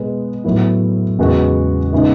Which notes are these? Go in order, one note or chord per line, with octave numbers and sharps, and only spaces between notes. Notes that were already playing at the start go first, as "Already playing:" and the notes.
Already playing: B2 G#3 B3
A2 F#3 B3 E4
E2 C#3 G#3 B3 F#4
C#3 G#3 B3 D#4